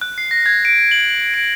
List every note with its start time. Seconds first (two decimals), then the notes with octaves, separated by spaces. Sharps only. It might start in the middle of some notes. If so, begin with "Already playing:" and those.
0.01 F#6
0.18 C7
0.31 A#6
0.46 G#6
0.65 D7
0.91 F#7
1.10 F#7
1.34 D7